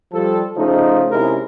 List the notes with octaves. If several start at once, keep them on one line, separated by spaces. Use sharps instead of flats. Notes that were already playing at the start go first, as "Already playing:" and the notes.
F3 G3 A4
C#3 F3 A3 D#4
C3 G#3 C#4 D#4 E4 A#4